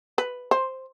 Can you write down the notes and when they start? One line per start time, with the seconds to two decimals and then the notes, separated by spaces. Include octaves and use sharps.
0.18 B4
0.51 C5